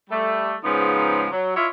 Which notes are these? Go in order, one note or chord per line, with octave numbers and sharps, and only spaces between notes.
G3 A3
G#2 C#3 F3 B3 D#4
F#3
E4 F4 C#5 D#5 E5